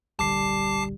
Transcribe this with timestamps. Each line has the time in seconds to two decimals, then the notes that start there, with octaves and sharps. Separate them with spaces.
0.19 D1 A#1 D3 G3 A5 D6 C7